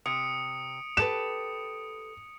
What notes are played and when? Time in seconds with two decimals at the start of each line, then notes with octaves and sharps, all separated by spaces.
0.06 C3 D#6 C#7 D7
0.97 G4 A4 B4 E7